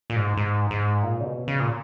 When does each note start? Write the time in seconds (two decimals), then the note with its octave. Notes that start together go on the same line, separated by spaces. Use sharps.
0.10 A#2
0.16 G#2
0.37 G#2
0.71 G#2
1.03 A#2
1.20 C#3
1.25 B2
1.48 C#3
1.60 A#2